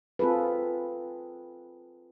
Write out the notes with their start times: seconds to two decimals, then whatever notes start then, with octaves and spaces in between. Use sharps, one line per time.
0.19 C4 F4 G#4 A4 B4